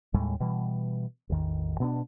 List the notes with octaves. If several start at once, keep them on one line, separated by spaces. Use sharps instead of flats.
D#2 A2 G3 G#3
B2 E3 G3
A1 E2 D#3
B2 B3 C#4 D4